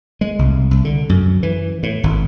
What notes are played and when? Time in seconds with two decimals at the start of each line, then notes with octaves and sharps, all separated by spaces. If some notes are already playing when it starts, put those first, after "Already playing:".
0.21 G#3
0.39 C2
0.71 C2
0.85 D3
1.09 F#2
1.43 E3
1.83 A2
2.04 G#1